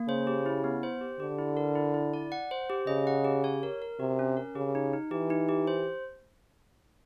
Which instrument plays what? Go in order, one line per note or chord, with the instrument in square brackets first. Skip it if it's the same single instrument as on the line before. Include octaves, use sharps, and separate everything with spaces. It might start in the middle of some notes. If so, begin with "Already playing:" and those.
Already playing: [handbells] A#3
[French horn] C#3 [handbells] C5
[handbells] G4
E4
B3
C5
G4
[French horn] D3 [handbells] G4
[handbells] E4
A#4
E4
E4
D5
F#5
C5
G4
[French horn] C#3 [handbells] D#5
[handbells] F#5
G4
C#5
A#4
A#4
[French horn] C3 [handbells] F#4
[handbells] C#4
A#4
[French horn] C#3 [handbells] G4
[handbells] D#4
D#4
[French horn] E3 [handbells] G4
[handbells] D#4
G4
C5